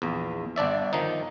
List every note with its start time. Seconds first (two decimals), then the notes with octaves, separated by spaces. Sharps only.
0.02 A#1 E2
0.56 G1 D4 D5 E5
0.93 D#3 F3 D#4